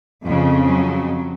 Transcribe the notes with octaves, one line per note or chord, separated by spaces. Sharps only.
F2 C#3 F3
F#3